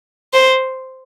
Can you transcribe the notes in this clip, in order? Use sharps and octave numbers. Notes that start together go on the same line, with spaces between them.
C5